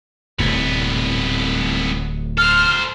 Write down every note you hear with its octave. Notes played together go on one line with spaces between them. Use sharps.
D1 C2 A2 C3 B3
A4 C5 F6